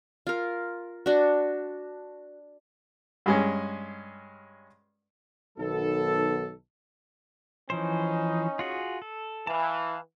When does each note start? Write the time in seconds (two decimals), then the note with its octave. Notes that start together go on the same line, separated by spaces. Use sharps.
0.27 F4 A#4
1.06 D4 F#4
3.26 G2 G#3 C#4
5.58 B1 D#3 F#3 B3 A4
7.70 E3 F3 C#4 D#4 C5
8.59 F4 F#4 G#4
9.02 A4
9.47 E3 F5 A5